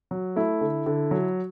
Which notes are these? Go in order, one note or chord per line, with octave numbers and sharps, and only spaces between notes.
F#3
A3 E4
D3
D3
F#3